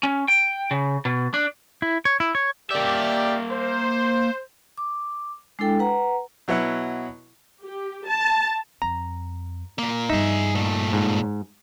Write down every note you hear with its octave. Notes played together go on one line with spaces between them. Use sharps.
C#4
G5
C#3
B2
D4
E4
C#5
E4
C#5
A#3 G4 D5 E5
C5
D6
G#3 D4 E4 A4 G5
B4 F#5 A#5
B2 F#3 B3 E4 F#5
G4
A5
F2 A#5
A#2 A#3
G2 C#3 D#4 G#4 E5
A#2 A3
G#2